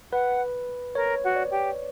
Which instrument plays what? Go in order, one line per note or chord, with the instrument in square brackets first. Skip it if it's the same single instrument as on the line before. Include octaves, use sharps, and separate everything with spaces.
[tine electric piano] B4 [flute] F#5
[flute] A#4 [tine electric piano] C#5
[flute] F#4
[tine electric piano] D5
[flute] G4